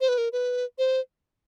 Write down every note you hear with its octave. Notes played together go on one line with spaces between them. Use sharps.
C5
B4
A#4
B4
C5